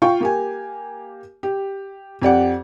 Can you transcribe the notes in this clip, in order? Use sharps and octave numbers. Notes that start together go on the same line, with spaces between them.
F4 G5 C#6
A#3 G4 G#5
G4
F2 G4 D5 F#5